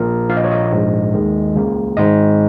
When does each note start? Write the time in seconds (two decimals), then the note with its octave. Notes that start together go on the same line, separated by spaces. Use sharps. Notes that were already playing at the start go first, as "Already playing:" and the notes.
Already playing: A#1 A#2 A#3 A#4
0.29 A#1 A#2 A#3 F5
0.37 D#5
0.44 C#5
0.51 D#5
0.72 A#1 G#2 F3 G#3
1.14 D#2 D#3 G#3
1.55 C#2 C#3 A#3
1.97 G#1 G#2 G#3 D#5